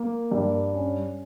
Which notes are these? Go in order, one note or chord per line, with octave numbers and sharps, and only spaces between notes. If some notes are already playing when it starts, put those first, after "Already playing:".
Already playing: A#3
G2
C#4